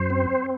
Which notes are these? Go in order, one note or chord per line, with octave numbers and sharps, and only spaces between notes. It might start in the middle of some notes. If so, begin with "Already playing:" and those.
Already playing: F#2 C5
C4